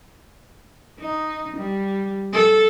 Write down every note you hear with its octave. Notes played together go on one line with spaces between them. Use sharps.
D#4
G3
A4